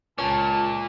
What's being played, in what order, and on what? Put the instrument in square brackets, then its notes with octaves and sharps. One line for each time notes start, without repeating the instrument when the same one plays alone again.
[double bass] C#2 [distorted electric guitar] A#2 [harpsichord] C#4 [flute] A5